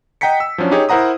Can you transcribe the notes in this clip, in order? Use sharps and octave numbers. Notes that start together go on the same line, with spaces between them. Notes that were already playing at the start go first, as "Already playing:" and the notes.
D#5 F#5 G5 A#5 B6 C#7
E6
F3 F#3 C#4 D4
D#4 G4 G#4 C#5
E4 A#4 C5 F#5 A#5 D#6